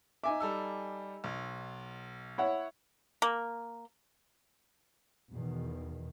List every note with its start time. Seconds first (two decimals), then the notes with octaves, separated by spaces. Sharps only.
0.24 D#4 E5 G#5 D6
0.40 G3 A4 E6
1.24 B1
2.38 E4 C#5 F#5
3.22 A#3
5.30 E2 B2 D#3